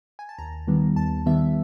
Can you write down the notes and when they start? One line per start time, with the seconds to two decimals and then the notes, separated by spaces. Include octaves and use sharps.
0.19 G#5
0.29 A5
0.38 D#2 A#5
0.68 D#3 G3 B3
0.96 D#2 A5
1.26 D#3 G3 B3 E5